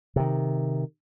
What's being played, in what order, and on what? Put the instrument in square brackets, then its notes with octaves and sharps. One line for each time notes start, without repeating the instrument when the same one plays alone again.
[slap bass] C3 D#3